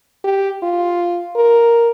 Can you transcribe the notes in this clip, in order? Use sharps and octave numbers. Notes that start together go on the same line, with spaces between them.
G4
F4
A#4